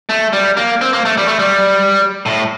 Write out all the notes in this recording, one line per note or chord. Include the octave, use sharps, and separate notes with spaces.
A3
G3
A#3
C4
A#3
A3
G3
A3
G3
A2